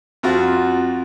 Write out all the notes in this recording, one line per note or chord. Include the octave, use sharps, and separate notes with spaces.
F2 F4 F#4